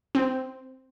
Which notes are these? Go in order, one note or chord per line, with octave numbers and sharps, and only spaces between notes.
C4